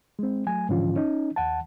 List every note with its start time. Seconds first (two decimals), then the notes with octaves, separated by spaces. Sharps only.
0.19 G#3 C4
0.47 F#3 A3 G#5
0.69 G#2 D3 E3 F3 C#4 F4
0.96 C#4 D#4
1.36 D#2 F#5 A5